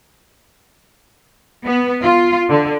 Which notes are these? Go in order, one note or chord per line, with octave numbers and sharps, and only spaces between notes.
B3
F4
D3